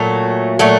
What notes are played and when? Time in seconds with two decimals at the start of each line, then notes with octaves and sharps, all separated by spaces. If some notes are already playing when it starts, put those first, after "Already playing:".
Already playing: A#2 F#3 A3
0.59 A#2 F#3 A3